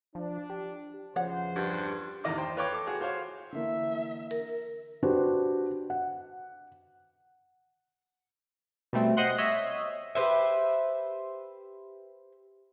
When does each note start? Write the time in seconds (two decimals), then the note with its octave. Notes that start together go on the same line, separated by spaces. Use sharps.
0.15 F3 D4
0.50 G4
1.16 E2 C#3 F3 C5 C#5 F#5
1.56 G2
2.24 A1 E2 D#3 D#5 D6 D#6
2.38 C5 G5 C6
2.56 F4 B4 C#5 G5 D6
2.73 A4 D6
2.86 F#4 G#4 C#5
3.00 F4 F#4 C5 C#5 F5
3.52 D3 E3 A#3 E5
4.31 A#4
5.03 D4 F#4 G4 B4 C5
5.90 F#5
8.93 B2 G3 A3 C4
9.17 C5 D#5 F#5 C6 F#6
9.38 C#5 D#5 E5
10.15 G4 B4 C5 E5